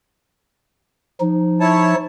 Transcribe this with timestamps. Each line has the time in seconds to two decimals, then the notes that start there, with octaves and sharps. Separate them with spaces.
1.21 F3 D#4
1.60 E4 C#5 A5